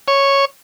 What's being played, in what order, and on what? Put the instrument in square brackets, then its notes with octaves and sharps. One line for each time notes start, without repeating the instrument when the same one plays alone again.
[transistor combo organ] C#5